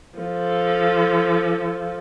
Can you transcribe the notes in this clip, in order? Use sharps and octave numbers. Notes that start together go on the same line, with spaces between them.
F3 A4